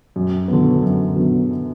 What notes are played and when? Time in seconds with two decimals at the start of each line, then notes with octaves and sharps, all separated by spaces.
0.16 F#2
0.48 D3 F#3 B3
0.83 F#2
1.16 D3 F#3 B3